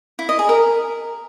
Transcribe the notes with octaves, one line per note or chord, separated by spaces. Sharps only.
E4
D#5
G#4
A#4